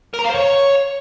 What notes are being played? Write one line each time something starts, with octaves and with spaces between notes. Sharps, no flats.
A#4
A#5
F5
C5
C#5